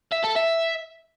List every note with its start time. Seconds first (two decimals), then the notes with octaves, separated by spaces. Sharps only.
0.12 E5
0.24 A4
0.36 E5